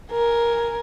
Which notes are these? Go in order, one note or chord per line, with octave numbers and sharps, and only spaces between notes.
A#4 G#5